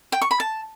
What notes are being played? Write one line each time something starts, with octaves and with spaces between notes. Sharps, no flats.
G5
C#6
B5
A5